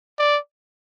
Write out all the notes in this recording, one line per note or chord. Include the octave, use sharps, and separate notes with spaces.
D5